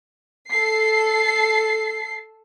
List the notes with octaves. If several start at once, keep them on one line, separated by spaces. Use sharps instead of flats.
A4 C7